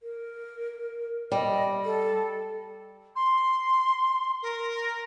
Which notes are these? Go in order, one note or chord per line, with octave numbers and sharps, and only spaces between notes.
A#4
G3 D#5
A4
C6
A#4